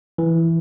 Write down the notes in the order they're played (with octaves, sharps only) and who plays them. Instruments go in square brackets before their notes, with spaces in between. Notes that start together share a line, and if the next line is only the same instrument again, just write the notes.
[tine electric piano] E3